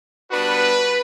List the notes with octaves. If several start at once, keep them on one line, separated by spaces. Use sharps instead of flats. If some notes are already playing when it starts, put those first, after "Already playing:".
G3 B3 D4 F#4 B4